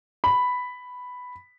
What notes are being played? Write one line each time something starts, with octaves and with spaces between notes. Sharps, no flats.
B5